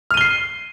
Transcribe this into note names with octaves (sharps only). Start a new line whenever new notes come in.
F6 C7 D#7 G7